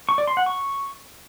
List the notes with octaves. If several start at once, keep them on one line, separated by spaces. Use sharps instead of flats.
C#6
D5
C6
F#5
C#6